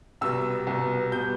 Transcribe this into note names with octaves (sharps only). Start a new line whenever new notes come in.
C2 B2 G3 B3 E6
C2 B2 G3 B3
B2 G3 B3 G6